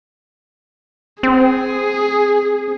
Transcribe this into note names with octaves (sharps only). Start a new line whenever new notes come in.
C4 G#4